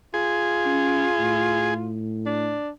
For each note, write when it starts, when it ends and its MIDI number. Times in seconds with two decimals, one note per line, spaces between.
0.14 1.99 65
0.14 1.74 68
0.66 1.06 61
1.20 2.57 45
2.26 2.69 62